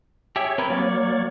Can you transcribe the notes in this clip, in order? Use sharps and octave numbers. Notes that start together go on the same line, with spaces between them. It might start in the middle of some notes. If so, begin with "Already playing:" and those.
G4 G#4 C#5 E5
C4 A#4 B4
F#3 A#3 C#5 D5